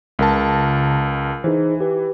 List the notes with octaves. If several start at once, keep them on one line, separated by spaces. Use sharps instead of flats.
C#2 C#3 A#4 A5
E3 D#4 G#4 C5
G4 B4